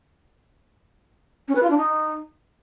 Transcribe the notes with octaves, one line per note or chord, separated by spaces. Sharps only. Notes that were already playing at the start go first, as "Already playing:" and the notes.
C#4
B4
F4
D4
D#4